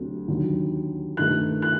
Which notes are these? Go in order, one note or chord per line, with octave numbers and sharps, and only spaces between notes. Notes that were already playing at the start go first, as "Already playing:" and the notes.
Already playing: D2 C3 F#3
D#2 D3 F#3
G2 D#3 A3 F#6
F#6